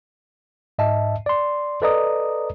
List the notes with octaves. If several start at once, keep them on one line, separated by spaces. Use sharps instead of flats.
G#2 D#5 E5 A5
D5 C6
A4 B4 D5 D#5 A#5 D#6